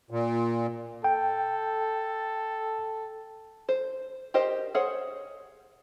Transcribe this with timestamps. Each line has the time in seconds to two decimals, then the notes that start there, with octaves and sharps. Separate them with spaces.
0.10 A#2
1.04 A4 G5
3.69 C5
4.34 G4 A#4 C5 D#5
4.75 G#4 C5 C#5 F#5